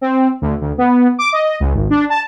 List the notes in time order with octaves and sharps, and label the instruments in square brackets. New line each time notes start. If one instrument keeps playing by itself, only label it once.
[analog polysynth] C4
D2
D2
B3
D6
D#5
C#2
G#1
D4
A5